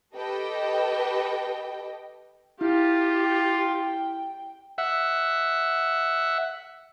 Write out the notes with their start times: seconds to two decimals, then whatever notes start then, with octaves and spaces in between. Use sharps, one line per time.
0.15 G4 A4 B4 D#5 G5
2.61 E4 F4 G4
3.17 G5
4.78 E5 F#5